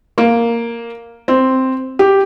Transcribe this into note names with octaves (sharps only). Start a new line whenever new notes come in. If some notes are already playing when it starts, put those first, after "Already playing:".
A#3
C4
G4